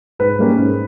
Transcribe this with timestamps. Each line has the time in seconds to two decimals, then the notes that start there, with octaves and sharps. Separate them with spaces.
0.19 G#2 B4
0.39 G3 A#3 C#4
0.58 G#2